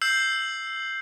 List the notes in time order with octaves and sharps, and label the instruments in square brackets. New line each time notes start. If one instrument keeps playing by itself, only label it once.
[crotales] E6 G6 C7 F#7